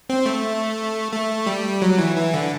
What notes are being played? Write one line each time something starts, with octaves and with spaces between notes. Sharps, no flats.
C4
A3
A3
G3
F#3
E3
E3
D3